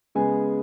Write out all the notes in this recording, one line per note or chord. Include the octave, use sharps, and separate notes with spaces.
C#3 G#3 B3 G#4 G#5